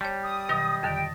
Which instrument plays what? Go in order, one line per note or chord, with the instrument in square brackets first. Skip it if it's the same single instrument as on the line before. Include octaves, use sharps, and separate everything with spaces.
[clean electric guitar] G3 [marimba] C#5 A5
[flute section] D#6
[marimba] B2 D#3 F#3 [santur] D#5
[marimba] F2 D3 D#3 [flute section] G5 [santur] A5